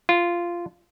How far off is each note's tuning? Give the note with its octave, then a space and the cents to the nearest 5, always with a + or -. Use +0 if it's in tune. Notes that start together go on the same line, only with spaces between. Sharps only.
F4 -10